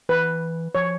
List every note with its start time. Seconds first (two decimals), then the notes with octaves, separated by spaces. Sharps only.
0.09 E3 B4
0.75 F3 C#5